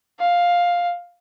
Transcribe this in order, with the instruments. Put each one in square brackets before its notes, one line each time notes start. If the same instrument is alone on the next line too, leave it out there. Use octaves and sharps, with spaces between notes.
[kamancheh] F5